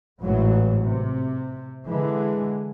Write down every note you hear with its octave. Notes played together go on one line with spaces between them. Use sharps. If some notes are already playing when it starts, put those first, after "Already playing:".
A1 G#2 E3 F#3
C3
D3 E3 G#3